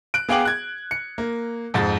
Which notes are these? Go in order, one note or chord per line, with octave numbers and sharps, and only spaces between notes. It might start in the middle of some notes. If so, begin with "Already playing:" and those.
F#6 D7
B3 G#4 F5 G5 D6 F#7
F#6 G#6
C#7
A#3
F2 G#2 A6